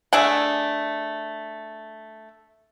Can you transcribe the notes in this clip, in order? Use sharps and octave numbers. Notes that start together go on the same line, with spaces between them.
A3 D4 G#4 F#5